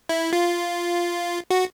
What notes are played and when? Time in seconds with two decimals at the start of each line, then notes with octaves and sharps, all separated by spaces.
0.09 E4
0.33 F4
1.50 F#4